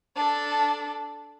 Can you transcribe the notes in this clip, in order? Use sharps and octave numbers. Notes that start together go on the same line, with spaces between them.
D4 A4